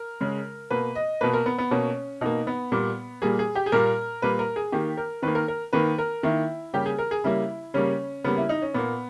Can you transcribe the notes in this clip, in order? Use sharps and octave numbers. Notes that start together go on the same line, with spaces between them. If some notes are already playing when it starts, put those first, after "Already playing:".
Already playing: A#4
C#3 G#3
B2 A#3 B4
D#5
B2 A#3 B4
A#4
B3
B3
B2 A#3 C#4
B2 A#3 D#4
B3
A#2 G3 A#3
A#2 G3 A#3 G#4
G#4
G4
G#4
A#2 G3 A#3 A#4
A#2 G3 A#3 B4
A#4
G#4
D#3 A#3 G4
A#4
D#3 A#3 B4
A#4
A#4
D#3 A#3 B4
A#4
D#3 A#3 E4
C#3 G3 A#3 G4
G#4
A#4
G#4
C#3 G3 A#3 E4
C#3 G3 A#3 C#4
C#3 G3 A#3 B3
E4
D#4
C#4
A#2 A#3 B3